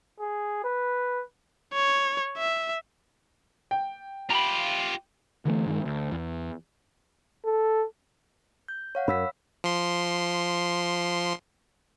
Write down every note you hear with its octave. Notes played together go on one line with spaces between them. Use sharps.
G#4
B4
C#5
E5
G5
F4 G4 A#5 B5
D3 E3 G3 A3
G2 D#3 G#3
D2
E2
A4
G6
C#5 F5 F#5
F#2 B5 E6 B6
F3 C6